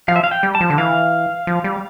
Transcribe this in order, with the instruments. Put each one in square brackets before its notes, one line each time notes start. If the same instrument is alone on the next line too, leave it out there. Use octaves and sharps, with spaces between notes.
[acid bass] F3 [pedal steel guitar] F5
[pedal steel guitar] E5
F5
G5
[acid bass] G3
[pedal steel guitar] A5
[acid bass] F3
D3
[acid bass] E3 [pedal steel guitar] F5
[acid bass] F3
G3